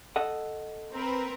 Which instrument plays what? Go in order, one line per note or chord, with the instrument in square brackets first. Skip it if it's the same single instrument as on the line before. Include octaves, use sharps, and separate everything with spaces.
[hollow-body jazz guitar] A4 D#5 F#5
[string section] C4 A#4 B4